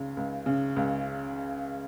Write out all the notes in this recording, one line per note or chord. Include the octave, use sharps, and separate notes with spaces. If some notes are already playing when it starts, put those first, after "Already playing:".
Already playing: C#2 C#3
C#2
C#3
C#2